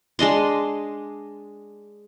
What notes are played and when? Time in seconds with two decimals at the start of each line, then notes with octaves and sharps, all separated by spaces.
0.19 G#3 D4 D#5 C6